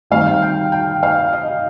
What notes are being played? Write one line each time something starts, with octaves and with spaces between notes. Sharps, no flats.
D#3 G3 C4 F5
G5
G5
F5
D#5